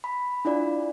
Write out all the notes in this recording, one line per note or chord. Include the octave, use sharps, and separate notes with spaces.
B5
D4 E4 F4 D5